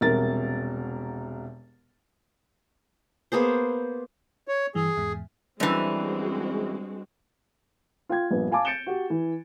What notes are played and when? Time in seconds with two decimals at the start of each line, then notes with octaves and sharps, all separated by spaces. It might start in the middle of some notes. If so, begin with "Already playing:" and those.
0.01 E1 C2 A#4 A6
3.32 A#3 B3 G#4 C5
4.48 C#5
4.75 G2 E3 G#4
4.97 E2 G#2
5.60 F#2 E3 G3 G#3 C4 D4 F#4 B4
8.09 F4 G5 G#6
8.31 A#1 G2 B3
8.52 F5 G#5 A5 D6
8.65 G6 A6 C#7 D7 E7 G7
8.87 F#4 G4
9.10 E3